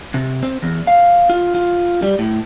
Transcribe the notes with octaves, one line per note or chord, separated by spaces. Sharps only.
C3
C4
E2
F5
F4
F4
G3
A2